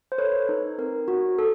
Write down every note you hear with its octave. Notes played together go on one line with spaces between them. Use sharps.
C5
A4 B4 C#5
D#4
C4 A#4
F#4
A4